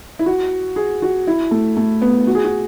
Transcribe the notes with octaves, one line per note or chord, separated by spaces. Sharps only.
E4
F#4
G#4
F#4
E4
A3
A3
B3
F#4
G#4
F#4